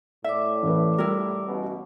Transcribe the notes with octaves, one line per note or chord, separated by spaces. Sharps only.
A2 D5 E5 D6
A1 B4
G3 E4 A#4
A1 B2